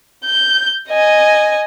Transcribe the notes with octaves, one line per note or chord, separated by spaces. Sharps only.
G6
D#5 G#5